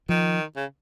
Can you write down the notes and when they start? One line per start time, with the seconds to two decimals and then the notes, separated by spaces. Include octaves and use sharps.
0.09 D#3 F3
0.56 C#3